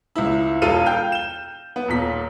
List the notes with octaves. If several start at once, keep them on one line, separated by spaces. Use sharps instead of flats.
C#2 E4
E1 F4 A4 F5 D#7
F5 G5 F6 G6
E7 G7
B3
D#1 A#2 B6